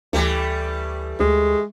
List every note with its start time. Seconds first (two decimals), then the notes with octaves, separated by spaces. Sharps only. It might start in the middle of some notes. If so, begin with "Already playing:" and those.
0.13 D2 E3 G3 A3
1.20 D2 G#3